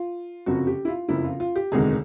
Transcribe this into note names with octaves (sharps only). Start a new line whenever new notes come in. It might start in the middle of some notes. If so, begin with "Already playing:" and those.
Already playing: F4
F#1 F2 C3 F3 F#4
G4
E4
F4
F#1 F2 C3 F3 E4
F4
F4
G4
E1 D2 C3 D#3 G#3 G#4